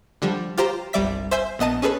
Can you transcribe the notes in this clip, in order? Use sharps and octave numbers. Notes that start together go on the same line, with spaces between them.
D3 F3 G3
F4 G4 C5 A#5
G1 C2 G3 D5 E5 B6
C5 E5 G#5 E6 G6
A#1 B3 D#5 A5 D#7
C#4 G#4 A4 B4